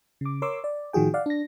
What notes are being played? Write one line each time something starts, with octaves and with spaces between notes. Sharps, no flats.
C#3 D6
A#4 C#5 C6 D6 E6
D5
A2 D#3 F3 F#4 G#4 G5
D5 F5 F#5
D4 A#6